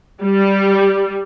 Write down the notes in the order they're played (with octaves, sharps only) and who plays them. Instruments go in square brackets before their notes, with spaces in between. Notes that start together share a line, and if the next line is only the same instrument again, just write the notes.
[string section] G3